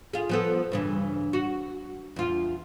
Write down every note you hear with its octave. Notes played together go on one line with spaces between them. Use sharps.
F4 G#4
F3 B3 A4
G2 C#3 E3
F#4
E2 F4